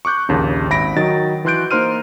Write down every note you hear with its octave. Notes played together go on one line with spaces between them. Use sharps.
C#6 D6 F#6 G6
A#1 D#2 C#3
G#1 E5 B5 A#6 D7
D#3 F#3 D#5 A6
E3 F#4 C6 F#6 G6 D7
A#3 D#4 C5 C6 F6 D#7